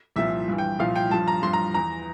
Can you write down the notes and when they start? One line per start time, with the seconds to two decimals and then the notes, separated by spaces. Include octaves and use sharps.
0.16 C2 A#2 F3 E5
0.48 G2 E3
0.58 G5
0.79 C2 A#2 F3 F5
0.96 G5
1.11 G2 F3 A5
1.28 A#5
1.42 G2 F3 C6
1.53 A#5
1.74 E2 E3 A#5